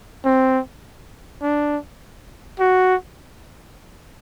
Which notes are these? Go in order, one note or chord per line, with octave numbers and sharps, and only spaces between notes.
C4
D4
F#4